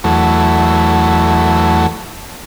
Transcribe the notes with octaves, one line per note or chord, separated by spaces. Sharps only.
E2 F#3 A3